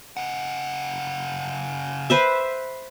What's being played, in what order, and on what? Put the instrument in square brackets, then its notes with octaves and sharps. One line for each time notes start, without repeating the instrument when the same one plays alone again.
[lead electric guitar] C#3 F#5
[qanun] B4 C5 E5